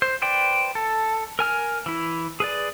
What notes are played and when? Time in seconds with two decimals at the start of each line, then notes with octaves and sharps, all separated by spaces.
0.02 C5
0.22 B4 C5 D5 G5
0.75 A4
1.39 A#4 G#5 F6
1.86 E3 E4
2.40 G#4 B4 D5